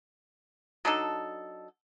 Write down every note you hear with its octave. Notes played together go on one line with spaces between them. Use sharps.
F#3 D4 D#4 A4